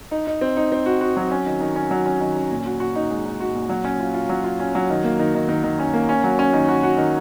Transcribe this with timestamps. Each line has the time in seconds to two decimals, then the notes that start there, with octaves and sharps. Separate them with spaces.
0.11 D#4
0.27 D#4
0.41 C4
0.57 D#4
0.72 C4
0.86 F#4
1.01 F#4
1.17 F#3
1.31 C#4
1.46 D#3
1.60 D#3
1.76 C#4
1.91 F#3
2.06 C#4
2.20 D#3
2.36 C#4
2.51 A#2
2.66 F#4
2.80 F#4
2.96 D#4
3.10 G#3
3.25 D#4
3.40 F#4
3.55 A#2
3.69 F#3
3.85 C#4
4.00 F4
4.14 F4
4.29 F#3
4.44 F4
4.60 C#4
4.75 F#3
4.90 D#3
5.04 A#3
5.19 D#3
5.35 D#3
5.49 D#3
5.64 D#3
5.79 C#4
5.94 A#3
6.09 C#4
6.24 F#3
6.39 C#4
6.53 D#3
6.69 F#4
6.83 F#4
6.98 D#3